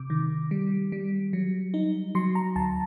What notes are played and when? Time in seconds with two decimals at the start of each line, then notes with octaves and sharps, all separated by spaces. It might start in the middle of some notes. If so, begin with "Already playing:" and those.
Already playing: C3 D6
0.10 D#3
0.51 G3
0.92 G3
1.33 F#3
1.74 D#4
2.15 F#3 C6
2.35 A#5
2.56 D2 A5